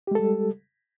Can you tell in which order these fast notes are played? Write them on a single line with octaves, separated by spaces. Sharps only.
G4 G#3 A4 G3